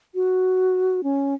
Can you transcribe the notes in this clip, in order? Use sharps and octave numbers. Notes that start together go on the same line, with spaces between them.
F#4
C#4